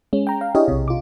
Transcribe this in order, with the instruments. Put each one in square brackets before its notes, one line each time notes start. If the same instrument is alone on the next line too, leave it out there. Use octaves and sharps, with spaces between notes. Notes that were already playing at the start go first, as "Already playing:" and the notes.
[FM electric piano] G#3 C#4
G5 A#5
F5
D4 E4 G4 G#4 C#5 D#5
B1 C3
F4 D6